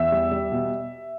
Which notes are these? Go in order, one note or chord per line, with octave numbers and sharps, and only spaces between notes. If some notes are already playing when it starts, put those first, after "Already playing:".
Already playing: E2 E5 E6
G3
G3
B2